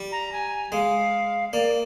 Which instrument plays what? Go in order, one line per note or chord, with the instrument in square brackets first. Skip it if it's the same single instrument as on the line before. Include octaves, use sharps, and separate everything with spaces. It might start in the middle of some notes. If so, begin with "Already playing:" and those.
Already playing: [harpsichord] G3
[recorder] A#5
G#5
[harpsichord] G#3 [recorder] F5
[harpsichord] A#3 [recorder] D5